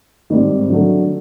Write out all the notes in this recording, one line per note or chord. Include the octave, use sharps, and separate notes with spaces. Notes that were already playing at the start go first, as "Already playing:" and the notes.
G#2 D#3 G3 C4
D3 F#3 A3